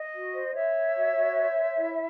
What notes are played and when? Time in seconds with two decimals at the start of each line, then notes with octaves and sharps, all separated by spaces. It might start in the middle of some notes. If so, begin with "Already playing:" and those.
Already playing: D#5
0.13 F#4
0.34 C5
0.54 C5 C#5 E5
0.75 C5
0.95 F#4
1.16 F#4
1.36 C5
1.58 C5
1.78 E4